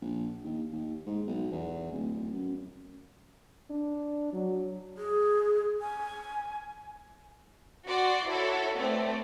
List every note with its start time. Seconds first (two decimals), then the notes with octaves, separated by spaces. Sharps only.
0.01 A#1
0.44 D#2
0.72 D#2
1.06 G#2
1.27 B1
1.52 E2
1.92 D1
2.33 F#2
3.70 D4
4.33 F#3
4.98 G#4
5.81 G#5
7.86 F#4 D5 C6
8.28 E4 F#4 A4 C#5
8.76 A3 B3 C4 D5